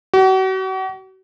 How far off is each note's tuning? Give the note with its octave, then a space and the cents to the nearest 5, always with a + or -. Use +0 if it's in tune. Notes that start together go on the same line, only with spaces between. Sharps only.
F#4 +40